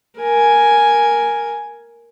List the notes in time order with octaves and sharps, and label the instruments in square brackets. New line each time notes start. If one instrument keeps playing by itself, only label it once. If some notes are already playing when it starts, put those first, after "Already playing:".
[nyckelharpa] A#4 G#5